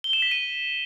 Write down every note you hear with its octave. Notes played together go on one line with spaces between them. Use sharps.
G7
E7
B6
D#7